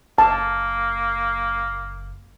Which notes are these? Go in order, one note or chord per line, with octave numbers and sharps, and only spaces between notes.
F#1 A#3 A5